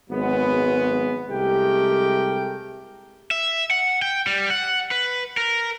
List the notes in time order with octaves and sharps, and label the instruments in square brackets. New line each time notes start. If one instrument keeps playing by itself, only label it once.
[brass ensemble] G#1 F#3 G#3 B3
C2 G#3 A3 G4 A#4 G5
[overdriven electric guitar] E5
F#5
G5
G3
F#5
B4
A#4